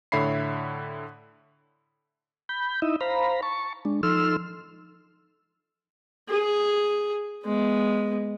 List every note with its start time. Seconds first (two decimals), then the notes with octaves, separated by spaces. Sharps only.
0.12 A2 D3 C#5 E5 B5 C7
2.49 B5 G6
2.82 D#4 E4 D#5 E5
3.01 C5 F5 A#5 B5
3.43 A5 C#6
3.85 G#3 D4
4.03 F3 D#4 A4 C6 E6 F6
6.29 G#4
7.45 G#3 B3